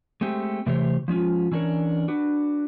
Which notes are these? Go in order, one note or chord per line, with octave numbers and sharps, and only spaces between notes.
G#3 A3 C4 G4
C3 E3 A3 G4 C5 C#5
F3 G#3 C#4 F4
E3 C#4 D4 A#4 C#5
D4 F#4 B4